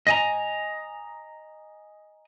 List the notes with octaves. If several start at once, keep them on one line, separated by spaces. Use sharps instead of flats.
D#5 G#5 A#5